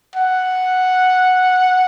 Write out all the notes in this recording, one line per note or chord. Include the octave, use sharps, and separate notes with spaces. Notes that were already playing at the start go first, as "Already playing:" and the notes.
F#5